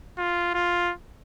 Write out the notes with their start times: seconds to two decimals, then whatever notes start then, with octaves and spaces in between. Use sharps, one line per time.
0.18 F4
0.54 F4